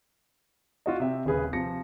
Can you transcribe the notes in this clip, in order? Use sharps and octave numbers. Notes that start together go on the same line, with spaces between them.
F4 F#4 D#5
C3 E5 G5
D#1 C#3 G#4 B4
C3 F3 A#6 C#7